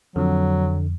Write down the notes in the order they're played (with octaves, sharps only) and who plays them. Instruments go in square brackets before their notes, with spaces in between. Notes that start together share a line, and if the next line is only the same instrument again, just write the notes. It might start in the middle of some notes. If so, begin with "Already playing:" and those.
[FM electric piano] F2 [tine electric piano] D3 [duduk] F#3